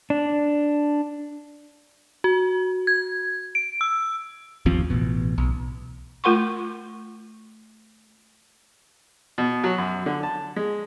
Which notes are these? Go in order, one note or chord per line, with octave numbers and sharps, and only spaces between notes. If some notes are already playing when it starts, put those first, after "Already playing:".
D4
F#4
G#6
D7
E6
G1 D#2 F3 C4
A1 B2
B1
A3 F4 A#4 F#5 C6 C#6
B2
F#3
F#2
D3
A5
G#3